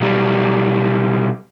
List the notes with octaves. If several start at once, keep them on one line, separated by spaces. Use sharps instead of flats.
B1 G3